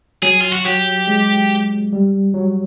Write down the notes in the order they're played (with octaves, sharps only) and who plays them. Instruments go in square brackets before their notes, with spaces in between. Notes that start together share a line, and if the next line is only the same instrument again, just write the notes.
[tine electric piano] F#3 [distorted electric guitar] G#4
[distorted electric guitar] F4
F#4
[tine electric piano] F#3 [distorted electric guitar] G4
[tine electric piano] G#3
G#3
G3
F#3